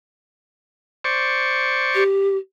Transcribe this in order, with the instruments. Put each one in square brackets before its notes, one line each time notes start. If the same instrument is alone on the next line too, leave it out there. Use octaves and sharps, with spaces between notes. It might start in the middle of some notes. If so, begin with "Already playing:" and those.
[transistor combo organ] C5 D5 C#6
[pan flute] G4